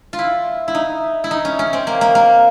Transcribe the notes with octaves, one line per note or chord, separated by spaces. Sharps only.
F4
E4
E4
D#4
E4
D#4
C#4
C#4
C4
A#3
A#3
A#3